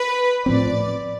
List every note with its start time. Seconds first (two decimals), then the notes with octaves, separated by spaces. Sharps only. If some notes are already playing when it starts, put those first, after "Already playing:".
Already playing: B4
0.46 A2 F3 C4 D5